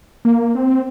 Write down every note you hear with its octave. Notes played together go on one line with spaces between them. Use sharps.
A#3
C4